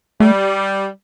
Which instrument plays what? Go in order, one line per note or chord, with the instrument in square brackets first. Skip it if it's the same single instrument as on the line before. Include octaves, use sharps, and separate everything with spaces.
[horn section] G3 [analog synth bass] A3